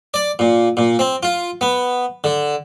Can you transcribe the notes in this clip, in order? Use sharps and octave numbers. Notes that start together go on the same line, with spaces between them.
D5
A#2
A#2
C4
F4
B3
D3